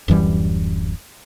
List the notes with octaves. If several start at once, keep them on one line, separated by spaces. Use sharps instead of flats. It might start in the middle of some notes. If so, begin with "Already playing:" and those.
D1 F#2 E3 G3